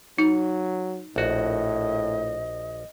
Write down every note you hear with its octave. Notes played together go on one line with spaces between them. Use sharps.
F#3 D#4
A#1 A2 F#4 D#5